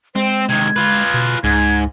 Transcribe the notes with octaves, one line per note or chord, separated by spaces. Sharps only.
G#3 C4 C5
C3 D#3 G#6
F4 B4
B2
C#2 G#2 G#6